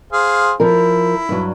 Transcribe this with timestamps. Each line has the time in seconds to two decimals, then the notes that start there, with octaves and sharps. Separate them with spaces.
0.13 G#4 C5 F5
0.60 F3 E4 A#4
1.29 G2 F#3